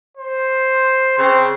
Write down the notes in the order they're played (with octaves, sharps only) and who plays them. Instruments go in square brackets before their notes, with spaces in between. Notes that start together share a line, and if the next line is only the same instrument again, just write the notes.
[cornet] C5
[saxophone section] C#3 C5 [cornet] C4